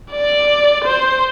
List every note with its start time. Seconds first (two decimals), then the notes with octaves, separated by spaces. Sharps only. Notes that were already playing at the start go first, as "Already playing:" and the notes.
0.12 D5
0.84 C5